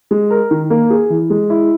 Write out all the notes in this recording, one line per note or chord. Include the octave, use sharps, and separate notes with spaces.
G#3
A#4
D#3
A#3
G#4
E3
G#3
E4